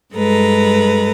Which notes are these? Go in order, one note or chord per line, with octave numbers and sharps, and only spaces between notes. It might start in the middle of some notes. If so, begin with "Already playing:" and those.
G2 G#3 A4 B4 A#5